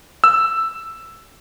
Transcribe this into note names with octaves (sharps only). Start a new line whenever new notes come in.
E6